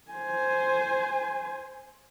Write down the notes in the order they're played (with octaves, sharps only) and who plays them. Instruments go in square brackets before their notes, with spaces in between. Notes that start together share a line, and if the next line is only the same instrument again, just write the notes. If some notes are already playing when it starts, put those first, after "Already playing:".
[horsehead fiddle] C5 G#5